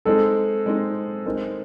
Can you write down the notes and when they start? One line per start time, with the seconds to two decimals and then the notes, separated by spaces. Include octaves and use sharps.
0.05 G#3 C4 D#4 A4
0.66 G#3 C4 D#4
1.26 G#3 C4 D#4 A#4